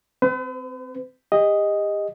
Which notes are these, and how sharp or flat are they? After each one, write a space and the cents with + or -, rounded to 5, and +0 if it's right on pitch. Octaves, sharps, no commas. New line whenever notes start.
C4 -15 B4 +45
G4 +40 D#5 +0